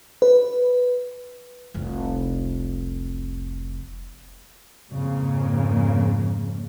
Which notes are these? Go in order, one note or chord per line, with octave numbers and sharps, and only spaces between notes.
B4
F1 C2
F2 G#2 C#3 A#3